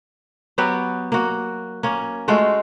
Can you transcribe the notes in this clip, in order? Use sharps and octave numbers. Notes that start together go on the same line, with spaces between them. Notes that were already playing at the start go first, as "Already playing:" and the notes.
F#3 B3 F#4 G4
A#3 F#4
A#3 C#4
G#3 A3 F4 F#4